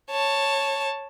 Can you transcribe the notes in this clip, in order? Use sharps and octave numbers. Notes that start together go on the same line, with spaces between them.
C#5 A5